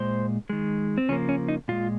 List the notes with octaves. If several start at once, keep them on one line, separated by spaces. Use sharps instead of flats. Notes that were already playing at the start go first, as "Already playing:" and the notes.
Already playing: A#2 G#3 C5
D#3 G#3
C4
C#3 F3 A#3 C#4
C#4
D#4
A#2 G#3 F4